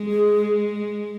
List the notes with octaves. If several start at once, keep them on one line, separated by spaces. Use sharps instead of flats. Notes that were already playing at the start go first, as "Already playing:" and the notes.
Already playing: G#3
G#4